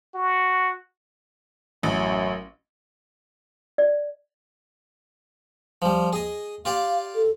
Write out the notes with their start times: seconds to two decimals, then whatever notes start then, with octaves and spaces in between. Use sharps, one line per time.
0.15 F#4
1.83 A1 F#2
3.78 D5
5.82 F3 G3
6.13 G#4 D#5
6.65 F4 G4 D5 F5
7.14 A4